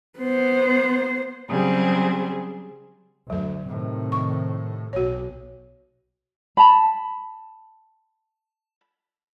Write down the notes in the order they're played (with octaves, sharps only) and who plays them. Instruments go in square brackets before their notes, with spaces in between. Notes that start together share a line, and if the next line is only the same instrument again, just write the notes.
[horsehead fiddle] B3 C5
[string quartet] C#3 F#3 G3 C4 G#4
[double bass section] D2 [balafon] F#3 A4
[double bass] A2 [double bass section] C3 D#3
[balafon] C#6
[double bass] B1 [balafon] F#4 C#5
[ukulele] A5 B5